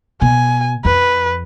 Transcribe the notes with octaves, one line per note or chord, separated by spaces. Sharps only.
B2 G#5
F2 B4